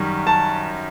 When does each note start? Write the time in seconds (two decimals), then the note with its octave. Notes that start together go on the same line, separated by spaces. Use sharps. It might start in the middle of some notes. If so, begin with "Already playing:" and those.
Already playing: F#2 D#3 G3
0.27 A5